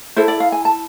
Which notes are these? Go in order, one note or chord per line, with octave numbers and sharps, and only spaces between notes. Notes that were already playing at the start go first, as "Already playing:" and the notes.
E4 A4 C5
D5
F5
G#5
A5